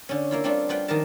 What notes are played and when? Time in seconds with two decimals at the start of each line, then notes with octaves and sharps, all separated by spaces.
0.09 D3 C#4
0.31 A#3 E4 F4
0.44 G3 A3 C4 D4 F4
0.69 G3 F4 B4 F#5 G5
0.88 D#3 F3 G4 A#4 A5